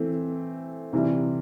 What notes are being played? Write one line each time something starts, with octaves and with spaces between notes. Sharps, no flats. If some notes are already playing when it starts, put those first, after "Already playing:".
Already playing: E3 A3 C4
C3 E3 G3